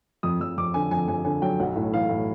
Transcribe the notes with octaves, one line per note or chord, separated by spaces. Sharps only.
F2 D#6
F2 E6
F2 D6
D3 G#5
F2 G#5
F2 G#5
D3 G#5
F#3 G5
B1 F#5
A2
E3 F5
A2